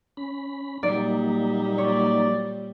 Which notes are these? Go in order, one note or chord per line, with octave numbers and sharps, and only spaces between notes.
C#4 B5
A#2 F#3 G3 A#3 D#4 D5
C#5 D5